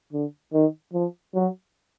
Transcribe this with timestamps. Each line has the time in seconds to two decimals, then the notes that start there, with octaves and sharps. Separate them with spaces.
0.13 D3
0.53 D#3
0.93 F3
1.35 F#3